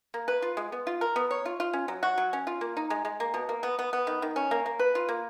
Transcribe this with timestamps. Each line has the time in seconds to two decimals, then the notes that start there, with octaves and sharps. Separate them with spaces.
0.14 A#3
0.28 B4
0.42 F4
0.57 G#3
0.72 B3
0.87 F4
1.01 A#4
1.16 B3
1.31 C#5
1.45 F4
1.60 F4
1.73 C#4
1.88 F#3
2.03 F#4
2.18 F#3
2.33 C#4
2.47 F4
2.61 A#3
2.77 D#4
2.90 G#3
3.05 G#3
3.20 A#3
3.34 B2
3.49 A#3
3.63 B3
3.79 B3
3.93 B3
4.07 D#3
4.22 D#3
4.36 C#4
4.51 A#3
4.66 A#3
4.79 B4
4.95 F4
5.09 A#3